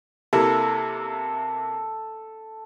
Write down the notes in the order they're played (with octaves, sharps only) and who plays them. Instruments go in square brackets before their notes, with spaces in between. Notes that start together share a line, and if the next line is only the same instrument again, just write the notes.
[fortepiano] C3 A#3 E4 [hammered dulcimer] A4